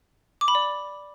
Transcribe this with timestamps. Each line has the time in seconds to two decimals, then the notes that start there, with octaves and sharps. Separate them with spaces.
0.41 D6
0.48 B5
0.55 D5